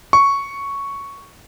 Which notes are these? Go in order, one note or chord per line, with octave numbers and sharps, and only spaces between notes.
C#6